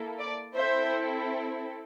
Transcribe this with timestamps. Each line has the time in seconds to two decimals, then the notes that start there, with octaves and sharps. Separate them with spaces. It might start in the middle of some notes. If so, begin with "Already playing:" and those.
Already playing: A#3 E4 A4
0.19 D5
0.55 C4 E4 A4 C5 E5